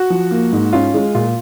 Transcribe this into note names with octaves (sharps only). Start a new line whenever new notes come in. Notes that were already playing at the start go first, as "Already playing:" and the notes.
Already playing: F#4
F3
A#3
G#2
C#4 F4
G#3
A#2 F4